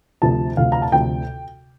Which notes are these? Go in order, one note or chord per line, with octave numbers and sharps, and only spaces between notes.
D2 C3 F3 A5
D2 C3 F3 F5
A#5
A5
D2 C3 F3 G5